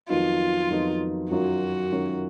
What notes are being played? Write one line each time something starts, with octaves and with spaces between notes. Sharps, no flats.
F2 D#3 F#3 B3 D#4 F4
F2 D#3 F#3 B3 D#4
F#2 D#3 F#3 C#4 F4 F#4
F#2 D#3 F#3 C#4 F4